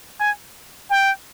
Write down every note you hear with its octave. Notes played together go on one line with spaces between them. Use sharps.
G#5
G5